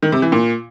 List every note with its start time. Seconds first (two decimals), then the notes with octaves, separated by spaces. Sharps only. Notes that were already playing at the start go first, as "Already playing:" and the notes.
0.02 D#3
0.12 C3
0.22 E3
0.32 A#2